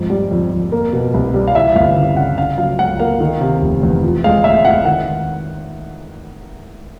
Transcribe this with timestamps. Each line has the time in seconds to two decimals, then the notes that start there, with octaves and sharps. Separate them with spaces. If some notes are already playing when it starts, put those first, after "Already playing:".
Already playing: F2 G#2
0.10 G3
0.31 F2
0.52 F2
0.72 A#3
0.93 B2
1.14 C2
1.34 G3
1.48 F5
1.55 E3 E5
1.76 G1 F5
1.96 C#3
2.17 C#3 F#5
2.38 C#3 F5
2.58 F#3 F5
2.79 C#2 F#5
3.00 A#3 F5
3.20 D#3
3.41 C3
3.62 F1
3.83 E2
4.03 F3
4.24 G#3 F5
4.44 A2 E5
4.65 A2 F#5
4.85 D#3 F#5